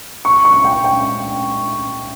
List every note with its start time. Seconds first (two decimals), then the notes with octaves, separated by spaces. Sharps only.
0.25 C#6
0.45 C#6
0.65 G5
0.84 G5